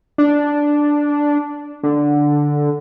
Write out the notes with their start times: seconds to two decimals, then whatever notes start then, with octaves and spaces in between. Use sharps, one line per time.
0.18 D4
1.83 D3